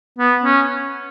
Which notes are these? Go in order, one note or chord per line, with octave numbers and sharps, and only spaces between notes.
B3
C#4